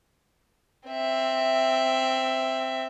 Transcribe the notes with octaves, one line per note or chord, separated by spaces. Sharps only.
C4 E5